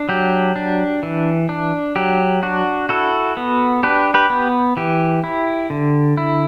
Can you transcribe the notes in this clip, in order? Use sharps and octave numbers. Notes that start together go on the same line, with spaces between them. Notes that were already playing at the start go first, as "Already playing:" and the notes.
Already playing: D4
F#3 G4
D4
E3
D4
F#3 G4
D4 F#4
E4 F#4 A4
B3
D4 G4 B4
G4 B4
B3
E3 G4
E4
D3
E4